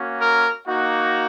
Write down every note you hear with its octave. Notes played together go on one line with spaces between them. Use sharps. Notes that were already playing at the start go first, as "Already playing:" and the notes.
Already playing: A#3 C#4 F#4
A#4
A#3 D#4 F#4